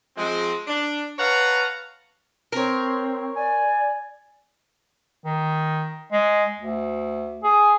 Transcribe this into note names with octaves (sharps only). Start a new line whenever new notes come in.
F3 G#3 C4
D4
B4 C#5 F5 F#5 A5 A#5
C4 A#4 C#5
D5 G#5
D#3
G#3
D2
G#4